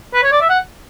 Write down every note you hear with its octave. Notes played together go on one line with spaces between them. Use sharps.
B4
C#5
D5
E5
F#5